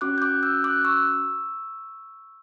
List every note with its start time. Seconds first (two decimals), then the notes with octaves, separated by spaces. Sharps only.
0.01 C#4 F#4 D6 F#6
0.18 G6
0.22 D6 F#6
0.43 E6 G6
0.64 D6 F#6
0.84 C#6 E6